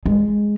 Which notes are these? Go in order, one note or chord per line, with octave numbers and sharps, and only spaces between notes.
G#3